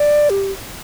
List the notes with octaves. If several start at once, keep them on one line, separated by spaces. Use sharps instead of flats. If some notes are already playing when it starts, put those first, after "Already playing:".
Already playing: D5
G4